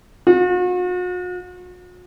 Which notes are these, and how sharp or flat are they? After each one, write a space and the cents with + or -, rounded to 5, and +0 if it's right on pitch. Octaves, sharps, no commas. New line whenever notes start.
F#4 -45